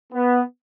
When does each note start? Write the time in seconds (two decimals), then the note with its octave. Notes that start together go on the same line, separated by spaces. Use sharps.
0.13 B3